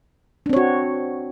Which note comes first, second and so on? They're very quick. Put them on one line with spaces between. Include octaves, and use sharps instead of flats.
D4 C4 C#5 F#4